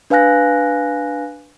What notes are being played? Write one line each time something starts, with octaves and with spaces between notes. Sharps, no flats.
D4 B4 F5 G#5 F#6 A#6